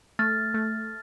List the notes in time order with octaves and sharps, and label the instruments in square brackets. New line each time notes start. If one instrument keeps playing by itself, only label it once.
[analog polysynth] A3 [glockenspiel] F6 A6
[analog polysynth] A3